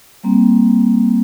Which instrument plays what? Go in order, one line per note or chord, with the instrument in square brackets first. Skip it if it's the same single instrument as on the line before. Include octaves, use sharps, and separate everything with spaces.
[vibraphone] G3 A#3 C4